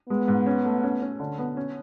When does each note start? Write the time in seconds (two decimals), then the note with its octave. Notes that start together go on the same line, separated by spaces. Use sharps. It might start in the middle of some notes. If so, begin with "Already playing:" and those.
0.09 G#3 B3
0.28 G#2
0.46 C#4
0.65 A3
0.84 C#4
1.02 C#4
1.20 D3
1.38 B3
1.57 C#4